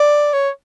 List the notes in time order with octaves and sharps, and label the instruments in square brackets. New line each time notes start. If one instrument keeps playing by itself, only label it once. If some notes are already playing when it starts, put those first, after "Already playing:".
Already playing: [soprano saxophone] D5
C#5